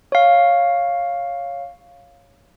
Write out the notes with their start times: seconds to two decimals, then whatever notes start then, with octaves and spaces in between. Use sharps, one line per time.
0.12 C#5 F5